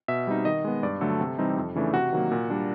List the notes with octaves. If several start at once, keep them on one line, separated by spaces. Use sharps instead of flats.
B2 E5
G3 C4 D#4
D#3 D#5
G#3 B3
G2 D5
D3 F#3 A3 A4
C3
E3 G3 C4 D#4
F2
C#3 E3 A3 D4
C3 F#4
D#3 F#3 A#3
A#2
G3 A#3 D4